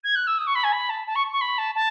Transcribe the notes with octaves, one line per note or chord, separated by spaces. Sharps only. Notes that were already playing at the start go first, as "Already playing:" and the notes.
G#6
F#6
E6
D#6
C#6
B5
G#5
B5
A5
A5
C#6
C#6
B5
A5
A5